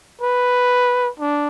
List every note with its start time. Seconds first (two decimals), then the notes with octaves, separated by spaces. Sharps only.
0.21 B4
1.20 D4